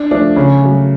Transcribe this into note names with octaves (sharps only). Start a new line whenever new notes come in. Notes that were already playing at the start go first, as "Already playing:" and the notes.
Already playing: D4
F3 A3 D4
C#3 C#4
F#3 A3